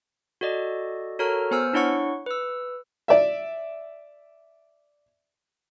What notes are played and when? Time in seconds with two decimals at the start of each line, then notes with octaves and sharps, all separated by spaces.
0.41 F#4 A4 D5 D#5
1.19 F#4 A4 A#4 C#5 A#5 F6
1.51 B3 C5 G#5 E6 F6 C#7
1.73 D4 E4 C#5 F#5 C#6
2.26 B4 E6
3.08 D5 E5